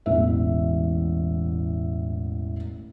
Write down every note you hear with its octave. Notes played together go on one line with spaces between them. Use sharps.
E1 A1 E5